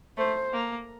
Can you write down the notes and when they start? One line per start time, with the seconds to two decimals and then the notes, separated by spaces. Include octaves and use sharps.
0.18 A3 C5
0.53 A#3